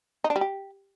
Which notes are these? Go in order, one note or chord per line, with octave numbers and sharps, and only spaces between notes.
D#4
D4
G3
G4